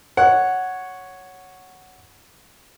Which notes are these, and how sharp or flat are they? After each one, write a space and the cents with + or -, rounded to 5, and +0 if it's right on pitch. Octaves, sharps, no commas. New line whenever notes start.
C#5 +0 F#5 +0